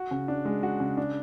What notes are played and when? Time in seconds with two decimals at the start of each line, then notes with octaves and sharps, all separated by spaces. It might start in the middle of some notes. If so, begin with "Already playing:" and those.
Already playing: F#4
0.11 C#3
0.28 D4
0.45 G#3
0.63 F#4
0.80 C#3
0.97 D4